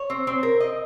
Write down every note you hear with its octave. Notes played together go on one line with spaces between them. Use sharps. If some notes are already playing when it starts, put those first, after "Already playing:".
Already playing: C#5
C4
C4
A#4
D#5